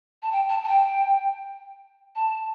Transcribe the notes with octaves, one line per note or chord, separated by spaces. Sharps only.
A5
G5
A5
A5
G5
A5